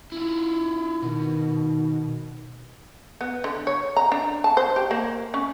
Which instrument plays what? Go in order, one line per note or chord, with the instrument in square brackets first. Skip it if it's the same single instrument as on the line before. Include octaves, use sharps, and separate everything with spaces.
[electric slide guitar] E4 F4
[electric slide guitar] B2 [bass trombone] D#3
[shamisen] B3
D3
C#5
A#5
D4
A5
C5
G4
A#3
C#4